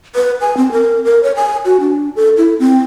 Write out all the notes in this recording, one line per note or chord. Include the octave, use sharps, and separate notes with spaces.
B4
G#5
C4
A#4
A#4
C#5
G#5
F#4
D4
A4
E4
C4